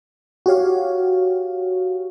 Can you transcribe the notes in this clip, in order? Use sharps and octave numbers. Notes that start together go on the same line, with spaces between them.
F#4 G4 C#5 F5